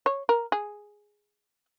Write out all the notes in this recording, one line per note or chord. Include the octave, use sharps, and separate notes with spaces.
C#5
A#4
G#4